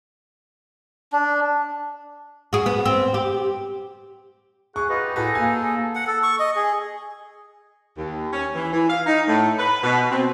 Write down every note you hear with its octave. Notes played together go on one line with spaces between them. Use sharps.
D4
F#4 G#4
B3
C4
G4
G#4 F#5 C#6
D#4 F4 F#4 B4 D#5
G4
A2 F#4 G#4 A4 B4
A#3 G#5
F#5
A4
C#6
D#5
G#4
D#2
C#4
E3
E3
F5
D#4
A2
B4
B2
C4